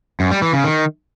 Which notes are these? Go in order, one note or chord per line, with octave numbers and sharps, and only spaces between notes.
F#2
G3
E3
C#3
D#3